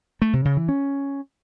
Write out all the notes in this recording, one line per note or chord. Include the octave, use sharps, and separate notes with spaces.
A3
C3
C#3
E3
C#4